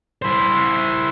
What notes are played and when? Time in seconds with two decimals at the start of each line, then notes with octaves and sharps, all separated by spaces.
0.22 E4 C5